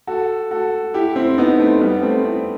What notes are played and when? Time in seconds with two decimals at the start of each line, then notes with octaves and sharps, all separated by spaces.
0.07 F#4 A4
0.51 F#4 A4
0.94 E4 G4
1.16 C4 E4
1.38 B3 D#4
1.60 A3 C4
1.81 G3 B3
2.03 A3 C4
2.25 C4 E4